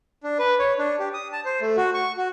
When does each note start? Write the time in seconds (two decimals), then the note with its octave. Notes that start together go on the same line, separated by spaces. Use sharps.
0.23 D4
0.39 B4
0.59 C#5
0.78 D4
0.99 G4
1.14 D#6
1.33 A5
1.45 C5
1.61 A3
1.77 F#4
1.94 C#6
2.17 F#4